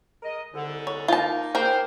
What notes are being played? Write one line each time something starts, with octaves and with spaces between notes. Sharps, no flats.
G#3 A#4 D#5
C2 G#2 D3
C#5
A#3 D#4 F4 A5
A#3 G4 G#4 A#4 C5 G5